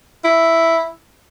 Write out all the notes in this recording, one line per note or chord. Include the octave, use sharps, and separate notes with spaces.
E4